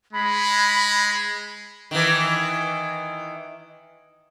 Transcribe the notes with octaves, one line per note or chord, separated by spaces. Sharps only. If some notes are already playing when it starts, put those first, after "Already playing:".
G#3 B5
D#3 E3